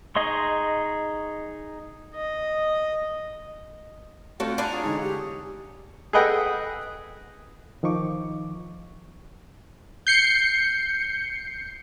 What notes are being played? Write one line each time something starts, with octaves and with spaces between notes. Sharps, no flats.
D#4 G#4 D#5 C6 C#6
D#5
A3 C4 F4 F#4 A4 F#5 G5
D4 D5 G#5 A#5 B5
F4 G#4 C#5
D3 E3 G#3 D#4
G4
G#4 A4 B4 D#5 F#5 G5
D#3 F3 D#4 C#6 D6
G6 C7 C#7